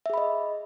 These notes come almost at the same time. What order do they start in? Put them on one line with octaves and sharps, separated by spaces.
E5 G#4 B5 D#5